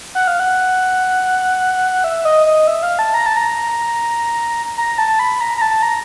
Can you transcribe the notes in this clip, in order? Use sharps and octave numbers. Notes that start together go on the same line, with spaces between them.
F#5
F5
F#5
E5
D#5
D#5
E5
F5
A5
A#5
A5
A#5
A#5
A5
B5
A#5
A#5
A5
A#5